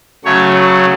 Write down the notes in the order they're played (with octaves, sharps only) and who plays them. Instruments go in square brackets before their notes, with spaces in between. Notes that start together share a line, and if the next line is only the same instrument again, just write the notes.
[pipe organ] C#3 F#3 A3 C#5